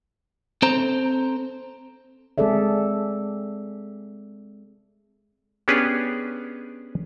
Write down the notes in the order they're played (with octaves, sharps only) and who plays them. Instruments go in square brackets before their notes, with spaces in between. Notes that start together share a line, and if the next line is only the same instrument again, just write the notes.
[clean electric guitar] C4 A4 C5 A#5
[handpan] G#3 C4 G#4 A4 D5 E5
[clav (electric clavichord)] B3 C#4 D4 G4 G#4 B4